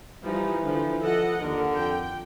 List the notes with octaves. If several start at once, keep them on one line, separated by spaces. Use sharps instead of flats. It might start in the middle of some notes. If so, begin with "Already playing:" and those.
E3 F3 G3 D#4
D3 F3
F3 A4 D#5 F#5
D#2 D3 A#4
F2 G5